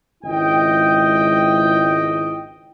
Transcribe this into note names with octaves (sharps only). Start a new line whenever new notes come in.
G#1 C#2 E4 D#5 G5